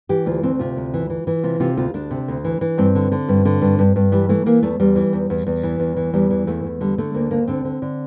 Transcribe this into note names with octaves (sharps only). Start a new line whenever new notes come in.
E3 G4
D2 F4
D2 C4
C3 F4
D2
E3
E3
E3
C3 F4
C3 F4
D2 F4
D2 D4
C3
D2
E3
E3
G2 C4
D3
D3
G2
D3
G2
G2
G2
E3 G3
E3 A3
E3 A#3
E2 A3
E2 G3
E3
E2
E2
E2
E3
E2
E3
E2 G3
E3
E2 A3
E2
D3 G3
D3 A3
D2 A#3
D2 A#3
D3 C4
D3
D3